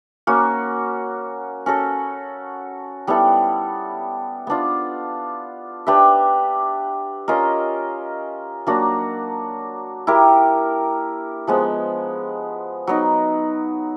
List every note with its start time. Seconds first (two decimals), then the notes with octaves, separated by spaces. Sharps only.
0.27 A#3 C#4 F#4
1.66 C#4 F#4 A4
3.07 G3 B3 E4 A4
4.47 B3 D4 F4
5.87 D4 G4 B4 E5
7.28 C#4 F4 A#4 D#5
8.67 F#3 A#3 D4 F#4
10.07 E4 G4 A#4
11.47 F3 G#3 B3
12.87 F#3 B3 D#4